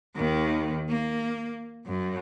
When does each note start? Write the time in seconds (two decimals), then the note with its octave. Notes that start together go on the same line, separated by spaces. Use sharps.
0.16 D#2 D#3
0.89 A#3
1.86 F#2